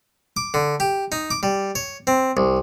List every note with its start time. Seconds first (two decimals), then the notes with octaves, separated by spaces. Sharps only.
0.37 D6
0.54 D3
0.80 G4
1.12 D#4
1.31 D6
1.43 G3
1.75 C#5
2.07 C4
2.37 C2